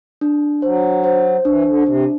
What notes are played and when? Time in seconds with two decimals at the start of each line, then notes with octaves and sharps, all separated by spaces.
0.21 D4
0.62 F#3 C5
1.04 C5
1.45 E3 D4
1.65 D3
1.86 C3 D4